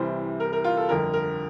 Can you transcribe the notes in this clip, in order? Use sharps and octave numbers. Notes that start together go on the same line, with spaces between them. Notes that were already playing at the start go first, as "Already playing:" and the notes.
Already playing: C2 C3 E3 G3 C5
A#4
A#4
F4
A4
G1 F2 D3 A#4
A#4